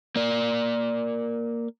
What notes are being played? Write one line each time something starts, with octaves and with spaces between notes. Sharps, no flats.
A#3 D5